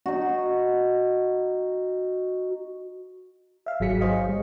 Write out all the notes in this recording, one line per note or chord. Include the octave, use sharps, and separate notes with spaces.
D#4 F#4
E5 F5
G#1 F#3 G#4 B6 C#7
G#4 C5 C#5 D#5 F5
G3